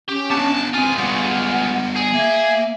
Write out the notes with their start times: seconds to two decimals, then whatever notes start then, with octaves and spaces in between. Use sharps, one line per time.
0.09 C#4 G4
0.31 B3 D4 A5
0.74 G#3 C4 F4 G#5
0.98 G3 B3 F#5
1.96 G#4
2.14 A#3 E5